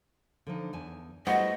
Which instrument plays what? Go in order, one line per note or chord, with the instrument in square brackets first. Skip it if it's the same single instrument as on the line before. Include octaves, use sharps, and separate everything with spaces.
[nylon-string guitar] D3 F3 D#4
E2 G#5 A5
[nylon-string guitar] G3 A3 E4 [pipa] B3 F#4 C5 [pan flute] D#5